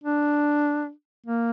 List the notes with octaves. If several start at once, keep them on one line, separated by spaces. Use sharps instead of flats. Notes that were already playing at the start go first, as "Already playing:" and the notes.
D4
A#3